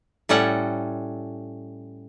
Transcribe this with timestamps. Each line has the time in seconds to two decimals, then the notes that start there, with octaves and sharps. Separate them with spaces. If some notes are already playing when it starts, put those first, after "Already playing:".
0.29 A2 G3 C#4 A4 F#5